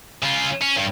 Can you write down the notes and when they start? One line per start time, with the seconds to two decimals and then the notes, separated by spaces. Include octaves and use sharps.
0.23 C#3 F4
0.62 C#4
0.76 G2